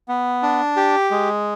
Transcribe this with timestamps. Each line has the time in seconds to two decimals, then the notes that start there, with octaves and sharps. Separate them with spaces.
0.08 B3
0.43 D4
0.76 G4
1.11 G#3